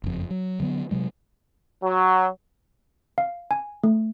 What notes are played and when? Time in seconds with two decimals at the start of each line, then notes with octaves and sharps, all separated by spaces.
0.04 F#1 F2
0.30 F#3
0.60 D3 F#3 A3 B3
0.91 C3 F#3 G#3
1.83 F#3
3.18 F5
3.51 G#5
3.84 A3